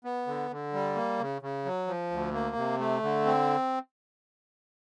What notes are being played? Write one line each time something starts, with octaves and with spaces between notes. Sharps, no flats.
B3
D3
D3
G3
A#3
C#3
C#3
F#3
F3
D2
A#3
C3
A3
D3
C4